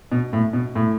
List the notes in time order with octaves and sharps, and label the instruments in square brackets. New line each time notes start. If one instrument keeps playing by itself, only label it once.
[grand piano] B2
A2
B2
A2